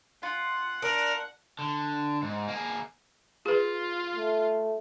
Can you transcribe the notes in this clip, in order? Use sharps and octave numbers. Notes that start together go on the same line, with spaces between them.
F4 F#5
D4 A#4
D3
G#2
A#3 G#4
F4 G#4 B4
A3